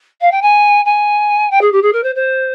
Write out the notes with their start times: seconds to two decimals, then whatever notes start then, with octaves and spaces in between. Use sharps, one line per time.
0.21 F5
0.32 G5
0.42 G#5
0.85 G#5
1.51 G5
1.61 G#4
1.72 G4
1.82 G#4
1.93 A#4
2.03 C5
2.15 C5